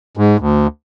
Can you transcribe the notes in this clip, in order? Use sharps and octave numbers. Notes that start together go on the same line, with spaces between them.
G#2
D2